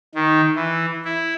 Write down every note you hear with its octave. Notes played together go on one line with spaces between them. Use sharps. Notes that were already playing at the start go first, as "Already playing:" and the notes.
D#3
E3
E4